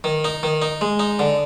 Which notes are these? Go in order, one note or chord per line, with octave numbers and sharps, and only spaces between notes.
D#3
D#4
D#3
D#4
G#3
D#4
D3